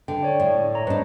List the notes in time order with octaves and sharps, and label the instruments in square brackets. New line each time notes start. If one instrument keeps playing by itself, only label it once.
[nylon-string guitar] D3 [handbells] G5
[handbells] C#5 D5
[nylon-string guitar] A2
[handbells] C#5 A#5
[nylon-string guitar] G#2 D4 [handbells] B4